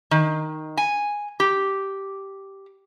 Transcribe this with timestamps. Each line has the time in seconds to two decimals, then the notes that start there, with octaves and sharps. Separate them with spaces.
0.11 D#3
0.77 G#5
1.40 G4